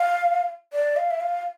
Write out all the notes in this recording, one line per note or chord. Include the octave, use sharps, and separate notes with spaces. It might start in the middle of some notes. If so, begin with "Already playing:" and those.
Already playing: F5
D5
F5
E5
F5